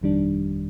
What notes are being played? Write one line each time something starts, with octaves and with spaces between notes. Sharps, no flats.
G1 F2 D#3 G3 D4